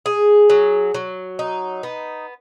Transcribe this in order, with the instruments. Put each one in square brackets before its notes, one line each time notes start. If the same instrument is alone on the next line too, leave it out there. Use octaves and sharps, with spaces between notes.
[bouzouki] G#4
F#3
F#3
D#4
B3